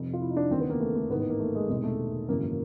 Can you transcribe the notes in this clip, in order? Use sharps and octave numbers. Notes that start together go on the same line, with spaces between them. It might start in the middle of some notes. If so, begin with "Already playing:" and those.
Already playing: F1 F2 C3
F4
E4
D#4
D4
D#2 C#3 E3 C4
B3
A#3
A3
A3
A1 G#2 D#3 B3
B3
A#3
A3
G#3
E1 E2 C3 D#3 G#3
A3
G#1 F#2 C#3 E3 A#3
A#3